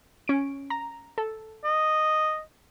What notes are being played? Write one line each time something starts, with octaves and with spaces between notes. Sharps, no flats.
C#4 D7
A#5
A4
D#5